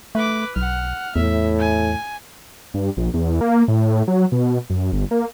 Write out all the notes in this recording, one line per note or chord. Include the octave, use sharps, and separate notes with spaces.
A3 B4 D6
B1 F#5 F6
E2 A2 E5
G#5
G2
A#1
E2
A#3
A2
F#3
B2
F#2
G1
A#3